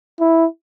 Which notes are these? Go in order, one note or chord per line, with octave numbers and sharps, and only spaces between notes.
E4